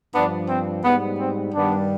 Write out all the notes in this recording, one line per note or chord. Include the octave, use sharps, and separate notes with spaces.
G2 F3 B3 D4
C4
G#2 G3 B3
C4
G2 D#3 G3 B3 D4